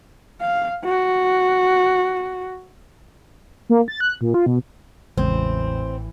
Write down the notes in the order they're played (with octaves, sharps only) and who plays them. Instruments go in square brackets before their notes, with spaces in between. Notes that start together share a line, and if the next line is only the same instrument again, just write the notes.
[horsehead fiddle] F5
F#4
[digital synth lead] A#3
A6
F#6
A#2
F4
B2
[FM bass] A1 [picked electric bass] E2 C#3 G#3 [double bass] A2 E3 [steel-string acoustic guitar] C4